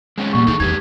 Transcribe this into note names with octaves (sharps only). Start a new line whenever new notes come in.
G#3 C4 C#4
E2 A#2 G3 C#6
D#3 D4 D#4 G#4 A4
D1 E2 D#4 G4 B4 G#6